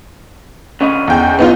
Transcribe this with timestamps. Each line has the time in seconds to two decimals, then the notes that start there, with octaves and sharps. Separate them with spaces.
0.81 D3 C#4 D#5
1.08 E2 G5
1.39 B3 D#4 F4